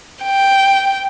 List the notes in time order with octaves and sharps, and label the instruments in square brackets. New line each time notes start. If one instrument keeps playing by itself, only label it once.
[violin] G5